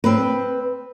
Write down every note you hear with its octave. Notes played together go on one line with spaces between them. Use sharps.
C4 B4